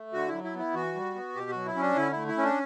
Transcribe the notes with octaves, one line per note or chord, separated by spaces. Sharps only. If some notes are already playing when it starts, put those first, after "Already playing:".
Already playing: A3
D3 F#4
F#3 E4
E4
B3 E4
E3 F#4
G3
B3
B2 G4
F#3 F#4
E4
C#4 D4
D3 E4
E4
A3
E4
C#4
D4